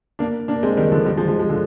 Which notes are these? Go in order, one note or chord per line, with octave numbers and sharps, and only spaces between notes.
A#3 D4
A#3 D4
G#3 C4
D#3 G3
D3 F3
D#3 G3
F3 G#3
F3 G#3
F3 G#3
D3 F3